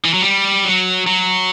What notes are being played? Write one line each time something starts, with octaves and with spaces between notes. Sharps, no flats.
E3
F#3
G3
F#3
F#3